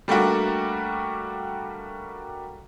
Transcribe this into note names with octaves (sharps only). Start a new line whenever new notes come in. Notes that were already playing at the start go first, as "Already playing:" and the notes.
G3 A3 A#3 D4 F#4